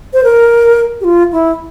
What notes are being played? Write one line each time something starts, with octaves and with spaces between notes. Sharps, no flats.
C5
A#4
G4
F4
E4